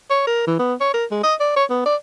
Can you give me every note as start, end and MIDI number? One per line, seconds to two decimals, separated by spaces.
0.10 0.23 73
0.27 0.45 70
0.47 0.56 52
0.59 0.74 59
0.81 0.92 73
0.94 1.05 70
1.11 1.22 56
1.24 1.35 75
1.40 1.54 74
1.57 1.65 73
1.70 1.83 59
1.86 1.96 74